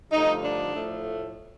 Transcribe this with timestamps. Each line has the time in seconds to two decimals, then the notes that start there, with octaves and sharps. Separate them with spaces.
0.11 G2 D3 F3 A3 D#4
0.43 D4
0.74 A2 F3 A3